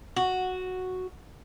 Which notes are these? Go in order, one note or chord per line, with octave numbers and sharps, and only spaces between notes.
F#4